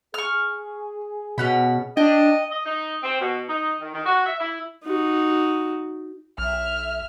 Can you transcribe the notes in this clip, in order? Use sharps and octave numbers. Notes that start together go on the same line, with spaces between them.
G#4 C#6 F6
B2 C#4 F#5 B5
D4 D#5 G5
D#5
D#4
C4
B2
D#4
D#3
D#3
F#4
E5
E4
D#4 F#4
B1 E5 F6